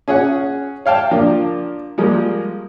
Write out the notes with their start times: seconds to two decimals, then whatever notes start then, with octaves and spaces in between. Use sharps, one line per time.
0.08 C#4 G#4 C#5 F#5
0.86 C#5 F5 G5 A5
1.11 F3 A#3 D4
1.98 F3 G3 G#3 A#3